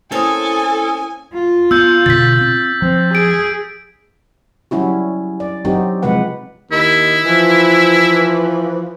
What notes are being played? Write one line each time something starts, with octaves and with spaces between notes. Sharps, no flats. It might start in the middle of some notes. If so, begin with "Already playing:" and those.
A#3 C4 C#4 E4 A4 G#5 D#6
F4
B3 E6 G6
B2 D3 A6 B6
C4
F3 C4
G#4 D7
F#3 G3 C#4 E4 F#4
D5
F#3 C4 D#4 F#4 G4
C3 F3 G#3 B4 F#5
D#2 D#3 D#4 E4
E3 F3